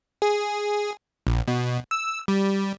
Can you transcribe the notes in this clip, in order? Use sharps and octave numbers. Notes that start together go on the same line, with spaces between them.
G#4
A#1
B2
E6
G3